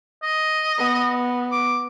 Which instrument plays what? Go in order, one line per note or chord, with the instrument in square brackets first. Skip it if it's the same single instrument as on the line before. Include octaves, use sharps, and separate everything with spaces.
[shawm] D#5
[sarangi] B3
[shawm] D6